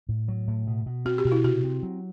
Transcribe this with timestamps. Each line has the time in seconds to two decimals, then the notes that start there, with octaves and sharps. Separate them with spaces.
0.09 A2
0.28 F#3
0.48 A2
0.67 B2
0.86 B2
1.05 C4 F#4
1.18 G4
1.25 B2 F#4
1.32 E4
1.44 C3 F#4
1.64 C4
1.83 F#3